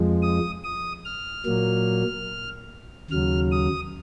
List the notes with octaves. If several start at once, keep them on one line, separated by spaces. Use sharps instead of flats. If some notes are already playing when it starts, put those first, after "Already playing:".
Already playing: F2 F3 G#3
D#6
D#6
F6
A#2 F#3 A#3
D#2 C#3 F#3 F6
D#6